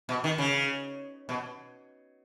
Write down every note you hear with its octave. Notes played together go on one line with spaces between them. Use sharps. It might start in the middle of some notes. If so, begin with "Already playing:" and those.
B2
D#3
C#3
B2